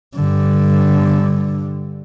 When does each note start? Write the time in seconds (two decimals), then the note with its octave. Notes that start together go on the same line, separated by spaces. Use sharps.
0.15 G2 D3